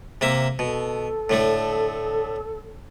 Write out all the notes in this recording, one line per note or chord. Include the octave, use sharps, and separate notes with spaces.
C3 A#3 E5
B2 A4
A2 D3 A3